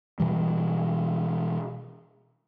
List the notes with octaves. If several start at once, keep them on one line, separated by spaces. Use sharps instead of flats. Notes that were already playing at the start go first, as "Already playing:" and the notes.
B2 E3 G3